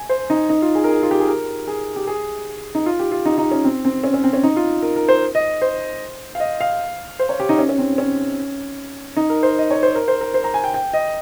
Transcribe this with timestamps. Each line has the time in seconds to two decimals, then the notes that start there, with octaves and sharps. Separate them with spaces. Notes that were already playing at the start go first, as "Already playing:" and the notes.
Already playing: G#5
0.09 C5
0.30 D#4
0.49 D#4
0.62 F4
0.75 G#4
0.84 A#4
0.88 G#4
1.03 F4
1.11 G4
1.20 G#4
1.28 A#4
1.68 G#4
1.96 G4
2.07 G#4
2.75 D#4
2.86 F4
2.99 G4
3.12 F4
3.25 D#4
3.38 D#4
3.51 C#4
3.65 C4
3.85 C4
4.04 C#4
4.14 C#4
4.24 C4
4.33 C#4
4.43 D#4
4.56 F4
4.82 A#4
4.96 A#4
5.09 C5
5.35 D#5
5.62 C5
6.35 F5
6.40 D#5
6.60 F5
7.19 C5
7.29 C#5
7.40 G4
7.49 D#4
7.59 C#4
7.69 C#4
7.78 C4
7.98 C#4
9.16 D#4
9.30 A#4
9.43 C5
9.58 D#5
9.71 C#5
9.83 C5
9.95 A#4
10.08 C5
10.21 A#4
10.34 C5
10.44 A#5
10.54 G#5
10.64 G5
10.74 G5
10.93 D#5